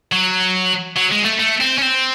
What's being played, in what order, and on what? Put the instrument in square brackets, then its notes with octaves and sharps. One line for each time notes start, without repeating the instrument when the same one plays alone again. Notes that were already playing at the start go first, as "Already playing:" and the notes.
[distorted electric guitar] F#3
F#3
G#3
A3
A3
C4
C#4
C4